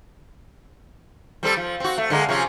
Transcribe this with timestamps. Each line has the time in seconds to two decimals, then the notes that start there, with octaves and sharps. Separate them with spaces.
1.43 G3 C4 A4
1.57 F3
1.80 C4 F#4
1.98 A3
2.10 D3 G#3 A#3
2.29 C3 F3 C#4